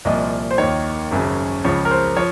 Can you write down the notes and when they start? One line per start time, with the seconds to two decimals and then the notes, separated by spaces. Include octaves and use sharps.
0.05 C2 A#2 F3 D#5
0.51 C5
0.58 D#2 D#3 C#5
1.11 G#1 F#2 C#3
1.64 C#2 C#3 F3 C#5
1.85 A#4
1.91 C5
2.16 F3 C#5